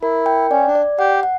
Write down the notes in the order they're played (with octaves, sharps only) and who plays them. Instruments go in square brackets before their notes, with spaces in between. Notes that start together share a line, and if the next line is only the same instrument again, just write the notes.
[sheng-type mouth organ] E4 [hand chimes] A#4
[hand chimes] G5
[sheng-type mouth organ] C#4 [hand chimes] D5
[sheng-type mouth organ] D4
[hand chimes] D5
[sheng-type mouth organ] G4 [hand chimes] F#5
[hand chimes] F#5